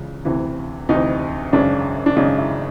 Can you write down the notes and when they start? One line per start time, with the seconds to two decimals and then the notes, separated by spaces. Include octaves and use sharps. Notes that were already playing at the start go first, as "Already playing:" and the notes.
Already playing: C#2 C#3 E3
0.25 D2 C3 E3
0.89 D2 C3 E3 D#4
1.53 G#1 F#2 C#3 D4
2.06 D4
2.16 G#1 F#2 C#3 D#4
2.38 E4